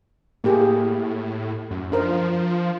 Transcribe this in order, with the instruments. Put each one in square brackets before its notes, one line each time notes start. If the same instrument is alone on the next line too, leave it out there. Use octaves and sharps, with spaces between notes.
[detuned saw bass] A2 [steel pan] A#3 G4 G#4
[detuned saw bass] F#2
[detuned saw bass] F3 [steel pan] D4 A#4 C5